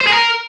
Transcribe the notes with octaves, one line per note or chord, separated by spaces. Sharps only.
C5
G#4
A#4